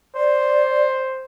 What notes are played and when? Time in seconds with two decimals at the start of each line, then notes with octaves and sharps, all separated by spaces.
0.15 C5 D5